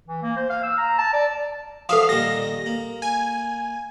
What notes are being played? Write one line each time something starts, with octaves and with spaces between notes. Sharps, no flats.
E3
A#3
C5
F5
E6
A#5
A5
D5
F3 F#3 A4 E5 F5 D#6
A#2 D#3 G3 A#6
A#3
G#5